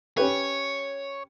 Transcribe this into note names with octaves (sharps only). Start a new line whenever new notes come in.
C#4 G4 B4 C#5